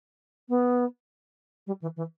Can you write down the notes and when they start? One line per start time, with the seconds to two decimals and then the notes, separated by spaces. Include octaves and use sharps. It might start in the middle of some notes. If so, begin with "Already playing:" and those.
0.49 B3
1.66 G3
1.81 E3
1.96 E3